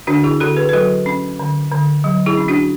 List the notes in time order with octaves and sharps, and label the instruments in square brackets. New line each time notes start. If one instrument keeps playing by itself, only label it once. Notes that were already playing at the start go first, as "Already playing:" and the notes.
[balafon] D3 D4 F#4
E4 G#4
D3 F#4 A4
G#4 B4
B4
F#3 F#4 A4
C#4
D3
D3
F#3
E4 G#4
C#4
D4 F#4